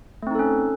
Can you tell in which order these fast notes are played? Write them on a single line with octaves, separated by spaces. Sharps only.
A3 C4 D#4 A4 C#4